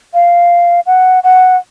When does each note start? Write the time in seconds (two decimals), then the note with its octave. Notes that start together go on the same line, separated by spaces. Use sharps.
0.14 F5
0.86 F#5
1.24 F#5